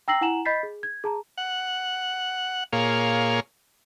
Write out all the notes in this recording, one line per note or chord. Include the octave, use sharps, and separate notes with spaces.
G5 A#5 E6 A#6 C7 F#7
E4 F#5 G#5 A#5 E7 F#7
D#5 B5 G6 A6 B6 C7
G#4
G#6
G#4 A5 A#5
F#5
A#2 A#3 G#4 C#5 F5